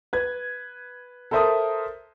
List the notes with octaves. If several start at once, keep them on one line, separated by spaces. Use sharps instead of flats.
B4 G#6
A4 A#4 C5 E5 A5 D#6